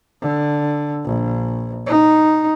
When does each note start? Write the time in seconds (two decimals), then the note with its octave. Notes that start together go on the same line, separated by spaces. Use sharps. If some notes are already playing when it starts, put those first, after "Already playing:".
0.22 D3
1.05 A#1
1.86 D#4